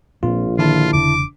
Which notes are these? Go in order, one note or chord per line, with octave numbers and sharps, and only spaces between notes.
A#1 A#2 C4 F4
D3 D#3 E4 F4 A5
E1 C#3 D4 D6